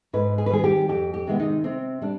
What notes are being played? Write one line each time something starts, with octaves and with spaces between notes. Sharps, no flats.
G#2 B4
G#4
B4
D#3 G3 C4 G#4
G4
F2 G4
G4
C3 D#3 G#3 B3
D#4
C3 C4
G3 D4